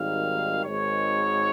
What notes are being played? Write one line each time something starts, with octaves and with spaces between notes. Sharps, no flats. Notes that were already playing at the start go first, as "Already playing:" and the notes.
Already playing: G#1 G#2 D#3 G3 F5
G#1 G#2 D#3 G#3 C#5